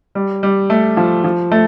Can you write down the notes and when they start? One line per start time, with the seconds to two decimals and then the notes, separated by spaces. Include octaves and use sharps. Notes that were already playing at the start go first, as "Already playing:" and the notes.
0.15 G3
0.43 G3
0.70 A3
0.97 F3
1.24 F3
1.52 A3